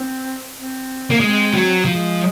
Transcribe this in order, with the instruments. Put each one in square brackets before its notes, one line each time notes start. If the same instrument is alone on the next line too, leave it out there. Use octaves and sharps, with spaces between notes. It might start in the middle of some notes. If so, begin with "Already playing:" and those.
Already playing: [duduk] C4
C4
[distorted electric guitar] A#3
[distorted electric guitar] G#3 [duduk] C4
[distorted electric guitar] F#3
[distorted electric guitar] F3 [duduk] G#3